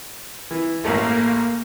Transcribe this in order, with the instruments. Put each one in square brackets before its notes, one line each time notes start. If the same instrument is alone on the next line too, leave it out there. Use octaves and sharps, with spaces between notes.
[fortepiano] E3
[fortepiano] A1 A3 [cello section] A#3